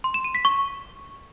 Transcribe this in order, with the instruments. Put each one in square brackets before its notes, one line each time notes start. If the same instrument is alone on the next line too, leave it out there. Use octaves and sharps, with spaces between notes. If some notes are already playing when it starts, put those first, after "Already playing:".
[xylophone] C6
E7
D#7
B6
C#6